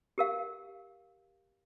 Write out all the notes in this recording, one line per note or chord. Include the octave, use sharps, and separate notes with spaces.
G4 A#4 F5